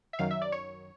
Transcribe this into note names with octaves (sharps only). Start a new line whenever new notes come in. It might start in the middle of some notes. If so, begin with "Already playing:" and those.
E5
F#2 D#3 F#3 F5
E5
D5
C#5